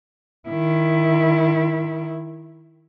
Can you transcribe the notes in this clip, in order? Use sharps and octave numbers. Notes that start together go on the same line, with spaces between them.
D#3 E4